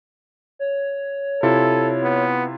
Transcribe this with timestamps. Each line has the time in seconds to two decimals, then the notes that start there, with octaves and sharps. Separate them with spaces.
0.59 C#5
1.43 C3 E4 F4 A4
2.03 B3